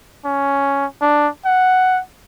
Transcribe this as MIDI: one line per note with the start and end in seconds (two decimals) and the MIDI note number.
0.25 0.86 61
1.02 1.28 62
1.45 2.01 78